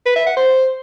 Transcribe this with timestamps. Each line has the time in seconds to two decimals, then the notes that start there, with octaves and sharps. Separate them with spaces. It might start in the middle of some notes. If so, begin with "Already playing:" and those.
0.06 B4
0.16 E5
0.26 F#5
0.37 C5